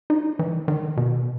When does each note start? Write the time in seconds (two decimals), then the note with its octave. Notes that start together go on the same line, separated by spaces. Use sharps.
0.10 D#4
0.39 E3
0.68 D#3
0.97 B2